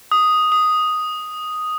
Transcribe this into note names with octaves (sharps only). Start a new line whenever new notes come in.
D#6
D#6